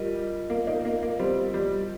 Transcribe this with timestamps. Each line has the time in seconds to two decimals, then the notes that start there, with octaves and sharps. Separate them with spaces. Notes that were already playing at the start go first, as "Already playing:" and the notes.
Already playing: G3 F4 A#4 D#5
0.50 A#3
0.67 A#3 D#4
0.85 A#3
1.03 A#3
1.19 G3 C4
1.54 G3